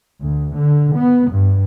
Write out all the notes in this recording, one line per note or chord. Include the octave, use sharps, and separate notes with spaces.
D2
D3
B3
G2